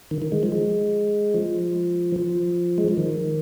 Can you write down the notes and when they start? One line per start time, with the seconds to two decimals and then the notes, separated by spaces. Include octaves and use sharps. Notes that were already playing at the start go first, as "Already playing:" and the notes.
0.11 D#3
0.22 D#3
0.32 G#3
0.43 F3
0.52 G#3
1.34 F3
2.16 F3
2.78 G#3
2.88 F3
2.97 D#3